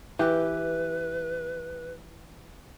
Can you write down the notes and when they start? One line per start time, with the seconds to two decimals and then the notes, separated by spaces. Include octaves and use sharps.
0.19 E3 G4 B4